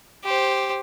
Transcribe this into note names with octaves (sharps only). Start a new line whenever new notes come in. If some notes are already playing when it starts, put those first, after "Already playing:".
G4 C5